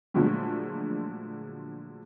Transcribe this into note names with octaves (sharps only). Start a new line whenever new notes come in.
A#2 D3 F3 F#3 G#3 A3